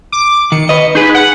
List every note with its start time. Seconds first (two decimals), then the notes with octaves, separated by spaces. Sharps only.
0.12 D6
0.52 D#3 C#7
0.69 B4 D#5
0.95 D#4 G#4 B4
1.15 F#5